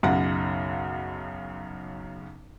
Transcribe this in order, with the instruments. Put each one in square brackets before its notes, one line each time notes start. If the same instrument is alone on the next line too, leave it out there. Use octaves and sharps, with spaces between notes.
[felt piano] B1 F#2 C#3 F#5